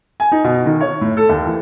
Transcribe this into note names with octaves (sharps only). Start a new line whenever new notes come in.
G#5
D#4
B2
D#3
C#5
A2
A4
D#2
E3